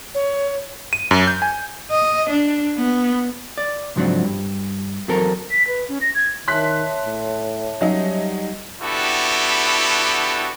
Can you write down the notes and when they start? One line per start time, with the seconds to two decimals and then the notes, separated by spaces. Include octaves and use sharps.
0.15 C#5
0.93 D#7
1.11 F#2
1.27 G6
1.42 G#5
1.91 D#5
2.30 D4
2.78 B3
3.58 D5
3.96 C#2 G#2 F3 F#3 C4 D4
4.24 G2
5.08 E2 F#3 C4 A4 A#4
5.51 B6
5.68 B4
5.89 C#4
6.01 A#6
6.15 G#6
6.48 D#3 C#5 E5 A5 C6 F#6 B6
7.05 A2
7.81 F#3 G3 C#4 D#4
8.81 B3 D4 E4 F#4 G4 A4